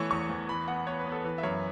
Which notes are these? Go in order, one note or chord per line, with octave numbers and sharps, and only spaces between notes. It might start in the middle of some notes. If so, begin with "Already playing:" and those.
Already playing: E3 A3 B3 C#5 C#6
E2 C#6
E2
E3 B5
B3 F#5
B3 C#5
B4
B3
A4
E3 B4
E5
F#2 C#5